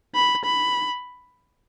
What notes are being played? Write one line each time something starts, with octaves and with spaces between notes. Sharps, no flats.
B5
B5